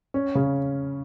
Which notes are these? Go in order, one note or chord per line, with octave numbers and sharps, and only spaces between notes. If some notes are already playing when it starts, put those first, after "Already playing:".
C#4
C#3